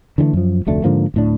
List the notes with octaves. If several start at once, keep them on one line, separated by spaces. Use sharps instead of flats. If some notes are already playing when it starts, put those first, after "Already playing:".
D3 E3 G3 A3
F#2 F3
F1 D2 A3 D4
G#2 D3 F3 A#3
D1 A2 D4